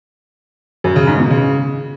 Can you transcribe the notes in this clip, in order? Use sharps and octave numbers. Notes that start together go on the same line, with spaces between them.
F#2
C#3
G#2
B2
C#3